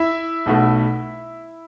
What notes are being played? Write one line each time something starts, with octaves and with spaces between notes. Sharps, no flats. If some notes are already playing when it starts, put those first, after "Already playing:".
Already playing: E4 E5
B1 B2 A3